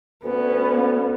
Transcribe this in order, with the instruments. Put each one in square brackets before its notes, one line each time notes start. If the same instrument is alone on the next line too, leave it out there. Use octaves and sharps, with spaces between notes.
[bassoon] D2 [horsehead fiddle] B3 C#4